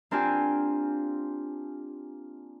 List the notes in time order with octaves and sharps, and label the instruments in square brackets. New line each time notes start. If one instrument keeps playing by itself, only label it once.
[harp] A#3 C4 D4 F4 G4 G#5